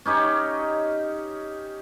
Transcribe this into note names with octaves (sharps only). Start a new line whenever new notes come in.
C#4 D#4 G4 C#5